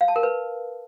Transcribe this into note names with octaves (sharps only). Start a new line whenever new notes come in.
F5
A5
A#4
B4